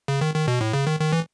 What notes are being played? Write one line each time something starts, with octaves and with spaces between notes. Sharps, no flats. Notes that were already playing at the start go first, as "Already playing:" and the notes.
C#3
D#3
D#3
B2
A2
C#3
D#3
D#3
E3